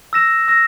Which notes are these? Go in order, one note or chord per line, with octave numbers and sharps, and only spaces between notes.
E6 A#6 E7
E6 A#6 E7